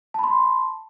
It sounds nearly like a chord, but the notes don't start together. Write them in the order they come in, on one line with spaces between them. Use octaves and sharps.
A5 B5 C6